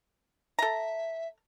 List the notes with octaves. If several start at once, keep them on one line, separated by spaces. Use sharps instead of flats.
A4 E5 A#5